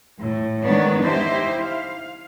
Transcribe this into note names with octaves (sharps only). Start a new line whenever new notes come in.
A2
D#3 G#3 B3 D4 C#5
D#4 E4 G4 C5 E5
F5